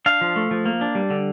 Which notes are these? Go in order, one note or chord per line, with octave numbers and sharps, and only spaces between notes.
D4 F5
F3
A3
F3
A#3
D4
G3
D3